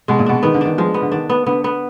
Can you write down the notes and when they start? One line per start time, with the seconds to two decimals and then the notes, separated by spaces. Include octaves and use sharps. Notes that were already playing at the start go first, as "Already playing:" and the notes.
0.08 B2 G#3
0.19 A#2
0.26 B2 D4
0.43 D#3 B3
0.54 D3
0.61 D#3 D4
0.78 F3 G#3
0.94 B3
1.02 D3
1.12 D#3 D4
1.29 B3
1.46 D3 B3
1.64 B3